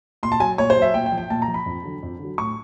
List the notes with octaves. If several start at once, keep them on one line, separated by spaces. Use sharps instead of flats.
A#2 C6
A5
F#3 G#5
A#2 C#5
C5
F#3 E5
A#2 G5
G5
F3
G5
A#2 A5
A#5
F3
B5
F2
D3 F#3
F2
D3 F#3
A2 C#6